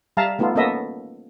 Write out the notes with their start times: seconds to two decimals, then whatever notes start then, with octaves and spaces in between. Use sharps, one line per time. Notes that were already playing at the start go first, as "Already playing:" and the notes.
0.17 G3 E5 F5 A5 A#5
0.39 A3 B3 D#4 F4 A4
0.55 A#3 B3 C#4 A4 D#5 E5